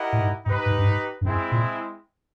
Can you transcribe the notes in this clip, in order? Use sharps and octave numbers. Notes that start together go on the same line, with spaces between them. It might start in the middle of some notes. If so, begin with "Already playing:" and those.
Already playing: E4 G4 A#4 D#5 F#5
A2
G#2
G#2 D#4 G4 B4
G#2
G2
G#2
G2
F#2 G#3 C4 E4 G#4
A#2